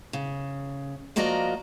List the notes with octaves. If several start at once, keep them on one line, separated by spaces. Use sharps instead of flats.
C#3
F3 A#3 F#4 D5 D#5 A#5